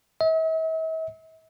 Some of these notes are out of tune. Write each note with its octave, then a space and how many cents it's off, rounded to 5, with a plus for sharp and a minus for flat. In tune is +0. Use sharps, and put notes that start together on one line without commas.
E5 -45